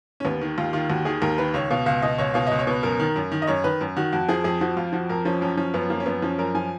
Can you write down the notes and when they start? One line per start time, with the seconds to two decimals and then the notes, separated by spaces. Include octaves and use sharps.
0.20 C#4
0.25 D#2 B3
0.41 D#3
0.58 D#2 F4
0.73 D#3 F4
0.90 D#2 F#4
1.05 D#3 G#4
1.22 D#2 A#4
1.38 D#3 B4
1.54 C#2 C#5
1.70 B2 F5
1.86 C#2 F5
2.02 B2 D#5
2.18 C#2 C#5
2.34 B2 F5
2.47 C#2 D#5
2.59 C#5
2.67 B2 B4
2.83 F#2 A#4
3.00 D#3
3.16 F#2
3.32 D#3
3.42 D#5
3.47 F#2 C#5
3.64 D#3 B4
3.81 F#2
3.97 D#3 F#4
4.12 F2 F#4
4.29 F3 G#4
4.44 F2 G#4
4.61 F3 F#4
4.77 F2 F4
4.93 F3 F#4
5.09 F2 A#4
5.25 F3 C#4
5.41 F#2 C#4
5.57 F3 C#4
5.74 F#2 B3
5.90 F3 A#3
6.00 C#4
6.06 F#2 B3
6.22 F3 C#4
6.38 F#2 A#4
6.55 F3 G#5